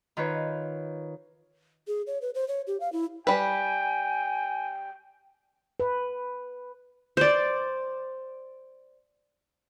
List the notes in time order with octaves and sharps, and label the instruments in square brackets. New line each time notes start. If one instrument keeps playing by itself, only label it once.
[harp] D#3 F4 B4 C#5
[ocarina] G#4
C#5
B4
C5
C#5
G4
F5
E4
[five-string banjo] G3 B4 [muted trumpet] G5 [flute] G#5
[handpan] B4
[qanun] C5 D5